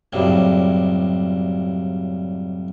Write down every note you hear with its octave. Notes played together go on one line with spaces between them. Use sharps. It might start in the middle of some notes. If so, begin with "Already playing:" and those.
C2 F#2 A2 C#3 G3